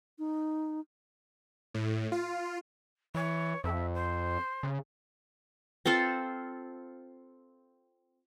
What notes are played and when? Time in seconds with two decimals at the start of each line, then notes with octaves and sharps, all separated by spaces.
0.19 D#4
1.74 A2
2.12 F4
3.15 E3 C#5
3.64 F2 E5
3.94 C5
4.63 C#3
5.86 C4 F4 A4 C5